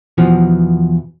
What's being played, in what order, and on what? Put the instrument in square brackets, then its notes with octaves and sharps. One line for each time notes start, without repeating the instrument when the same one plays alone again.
[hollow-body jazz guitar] E2 B2 E3 F3 B3